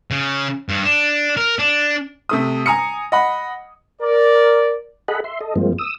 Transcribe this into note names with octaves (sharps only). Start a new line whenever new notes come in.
C#3
G2
D4
A#4
D4
C3 A3 D#6
G#5 A#5 D#6 C#7
D#5 F#5 B5
A#4 D5
G#4 A4 D#5 F#5 B5
E5 C6
A4 D#5
G2 F3 G#3 A#3 C4
D#6 E6